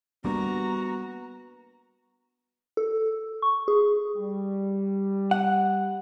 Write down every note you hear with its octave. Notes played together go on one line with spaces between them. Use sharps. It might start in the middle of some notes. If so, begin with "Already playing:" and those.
G3 A#3 B3 D4 F#4 A#5
A4
C#6
G#4
G3
F#5